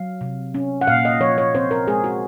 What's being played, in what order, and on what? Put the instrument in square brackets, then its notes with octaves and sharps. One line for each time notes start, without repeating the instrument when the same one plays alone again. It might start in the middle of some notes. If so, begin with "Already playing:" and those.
Already playing: [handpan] F#3 F5
C3
C#4
F#5
A#2 F5
D#5
F3 C#5
C#5
C4 C5
A#4
G#3 G#4
F#4